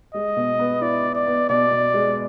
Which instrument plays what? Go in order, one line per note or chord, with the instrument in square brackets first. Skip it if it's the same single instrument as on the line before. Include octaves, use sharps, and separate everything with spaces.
[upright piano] G#3 [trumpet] D#5
[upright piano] B2
B3
[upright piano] E4 [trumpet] D5
[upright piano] E4
[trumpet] D5
[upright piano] B3
[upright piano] B2 [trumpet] D5
[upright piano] B2
G#3